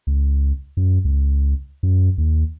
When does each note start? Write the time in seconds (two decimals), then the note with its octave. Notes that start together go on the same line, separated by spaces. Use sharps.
0.07 C#2
0.77 F#2
1.05 C#2
1.83 F#2
2.18 D#2